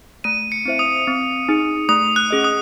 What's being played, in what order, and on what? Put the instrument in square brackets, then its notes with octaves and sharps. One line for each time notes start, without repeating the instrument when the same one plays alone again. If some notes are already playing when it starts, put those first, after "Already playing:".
[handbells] A3 [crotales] D#7
[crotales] C#7
[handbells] C4 E4 C5 E5
[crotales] D#6
[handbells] C4
D#4 G#4
[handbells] A3 [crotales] D#6
[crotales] F#6
[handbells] C#4 G#4 D#5
[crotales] D#6